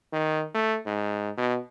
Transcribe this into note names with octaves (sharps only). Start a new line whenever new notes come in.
D#3
A3
G#2
B2